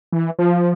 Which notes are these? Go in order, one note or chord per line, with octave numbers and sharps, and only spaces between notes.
E3
F3